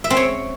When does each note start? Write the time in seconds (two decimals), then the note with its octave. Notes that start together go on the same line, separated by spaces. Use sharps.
0.04 E5
0.10 C4
0.17 C#5